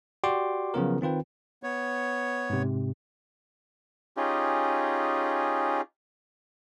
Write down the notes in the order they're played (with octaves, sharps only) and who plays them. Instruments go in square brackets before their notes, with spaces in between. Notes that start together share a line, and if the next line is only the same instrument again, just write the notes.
[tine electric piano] F#4 G4 D5 G5 C6 D6
C#3 F3 F#3 B3 F4 A#4
D#3 C4 F4 B4 G5
[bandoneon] B3 C#5
[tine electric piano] G#2 C3
[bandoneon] C#4 D#4 F4 G4 G#4